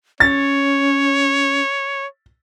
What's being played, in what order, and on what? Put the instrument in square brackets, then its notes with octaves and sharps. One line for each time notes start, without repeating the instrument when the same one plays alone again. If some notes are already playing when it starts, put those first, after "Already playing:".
[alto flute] C#4 [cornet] C#5 [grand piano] A6